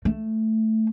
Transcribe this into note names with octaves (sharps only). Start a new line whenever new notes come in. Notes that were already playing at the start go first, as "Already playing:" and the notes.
A3